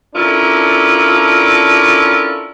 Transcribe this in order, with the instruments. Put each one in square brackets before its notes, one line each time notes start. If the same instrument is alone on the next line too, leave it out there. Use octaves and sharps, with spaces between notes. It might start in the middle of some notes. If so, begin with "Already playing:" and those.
[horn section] C#4 D4 E4 F4 A4 A#4